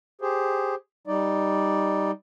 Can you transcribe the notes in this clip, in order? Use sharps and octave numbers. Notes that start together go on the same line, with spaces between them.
G4 G#4 C5
G3 D#4 D5